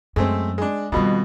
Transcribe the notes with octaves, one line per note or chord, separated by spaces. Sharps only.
F#2 G#3 A3 C4
G#3 D4
F2 B2 D#3 G3